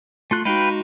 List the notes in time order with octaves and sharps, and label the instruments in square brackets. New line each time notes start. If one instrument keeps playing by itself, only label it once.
[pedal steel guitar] A3 F4 F#6 [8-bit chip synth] C6
[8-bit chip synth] G#3 D#4 F#4 [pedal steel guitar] B4 F5 G5